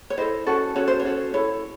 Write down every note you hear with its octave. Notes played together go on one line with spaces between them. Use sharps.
C#5
E4 A4 C5 D#5
C#4 F#4 A4
C#4 F#4 A4 C#5
C5
C#5
C#4 F#4 A4
E4 A4 C#5